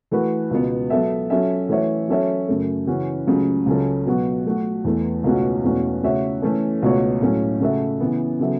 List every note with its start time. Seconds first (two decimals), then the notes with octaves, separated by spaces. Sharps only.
0.11 E3 A3 F#4 B4
0.51 C#2 B2 B3
0.90 F#3 B3 A4 E5
1.30 F#3 C#4 A4 E5
1.69 E3 A3 F#4 C#5 E5
2.08 F#3 C#4 A4 C#5 E5
2.48 F#2 C#3 A3
2.87 C#3 E3 C#4 F#4
3.27 C#2 C#3 F#3 A3
3.66 C#2 C#3 F#3 C#4 A4
4.06 B2 F#3 B3 F#4
4.45 F#3 A3 F#4
4.84 E2 E3 A3
5.24 C#2 B2 A3 C#4 F#4
5.64 E2 B2 A3 C#4 F#4
6.03 C#3 A3 F#4 C#5 E5
6.42 E3 A3 C#4 A4
6.82 C#2 B2 A3 F#4 C#5
7.21 A2 F#3 A3 C#4
7.60 C#3 A3 F#4 A4 E5
8.00 C#3 E3 B3
8.39 C#3 F#3 B3 A4 E5